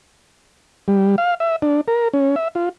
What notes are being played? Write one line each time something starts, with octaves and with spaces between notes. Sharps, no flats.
G3
F5
E5
D4
A#4
C#4
E5
F4